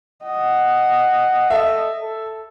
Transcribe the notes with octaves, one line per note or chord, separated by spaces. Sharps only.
D#5 F#5
A4 E5
A4